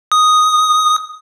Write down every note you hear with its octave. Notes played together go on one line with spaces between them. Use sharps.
D#6